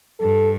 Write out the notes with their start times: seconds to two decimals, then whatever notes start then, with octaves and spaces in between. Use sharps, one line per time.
0.19 G2 A4